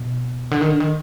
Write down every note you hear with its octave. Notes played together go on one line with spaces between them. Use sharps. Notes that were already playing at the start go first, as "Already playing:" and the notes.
Already playing: B2
D3
D#3
D3
D#3